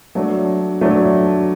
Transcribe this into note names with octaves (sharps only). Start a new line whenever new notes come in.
F#3 A3 D4
F#3 A3 D4